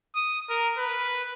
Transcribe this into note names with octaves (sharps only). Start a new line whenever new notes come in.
D#6
A#4
B4